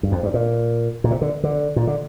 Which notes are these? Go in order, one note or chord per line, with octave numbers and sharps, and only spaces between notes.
G2
F2
G2
A#2
A#2
C3
D3
D3
A#2
D3